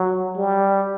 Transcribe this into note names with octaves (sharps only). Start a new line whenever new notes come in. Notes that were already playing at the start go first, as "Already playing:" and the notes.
Already playing: F#3
G3